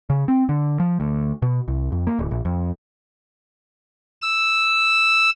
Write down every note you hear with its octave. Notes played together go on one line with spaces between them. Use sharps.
C#3
C4
D3
F3
D2
B2
C2
F2
A#3
D1
A#1
F2
E6